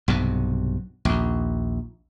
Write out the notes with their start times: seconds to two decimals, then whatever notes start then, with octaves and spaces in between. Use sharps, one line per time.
0.08 B1 G2 C3
1.05 A#1 D#2